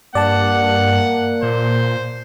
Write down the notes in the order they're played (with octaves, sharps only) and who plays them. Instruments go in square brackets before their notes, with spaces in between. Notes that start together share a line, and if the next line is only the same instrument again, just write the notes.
[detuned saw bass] G2 [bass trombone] A#3 [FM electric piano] D5 A5 [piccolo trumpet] F#5
[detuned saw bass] A#2 [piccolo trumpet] C5